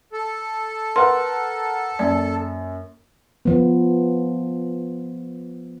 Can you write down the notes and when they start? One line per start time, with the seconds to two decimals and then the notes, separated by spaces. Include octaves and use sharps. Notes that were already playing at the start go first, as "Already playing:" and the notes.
0.13 A4
0.96 A#4 B4 F#5 C6
1.99 F#2 A#3 D5
3.45 F3 B3